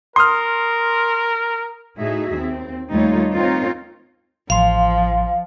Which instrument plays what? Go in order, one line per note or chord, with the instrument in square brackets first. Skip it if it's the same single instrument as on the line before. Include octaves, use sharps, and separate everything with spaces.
[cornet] A#4 [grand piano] C6 D#6 F6
[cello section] A2 D#4 F#4 G#4 E5
D#2 C4
D#2 G3 A3 D#4 F4 C#5
C4 D#4 F4 A#4 C#5
[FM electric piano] A1 C6 [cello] F3 [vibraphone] F5